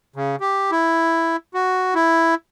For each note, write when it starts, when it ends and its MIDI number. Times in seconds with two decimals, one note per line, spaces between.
0.16 0.36 49
0.41 0.71 67
0.71 1.36 64
1.54 1.94 66
1.95 2.35 64